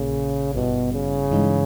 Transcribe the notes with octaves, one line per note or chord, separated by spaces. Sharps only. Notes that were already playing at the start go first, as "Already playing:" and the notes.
Already playing: A#1 A#2 C#3 A#3
G#1 G2 B2 G3 B3 E4
C#3
G2 E3 G#3 D#4